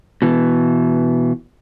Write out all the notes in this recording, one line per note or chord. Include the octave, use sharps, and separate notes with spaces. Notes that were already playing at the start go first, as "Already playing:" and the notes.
B2 E3